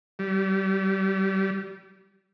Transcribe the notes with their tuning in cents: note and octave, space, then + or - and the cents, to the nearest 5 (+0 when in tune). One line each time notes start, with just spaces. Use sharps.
G3 -30